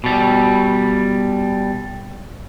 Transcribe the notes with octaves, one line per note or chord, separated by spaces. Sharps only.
B2 G3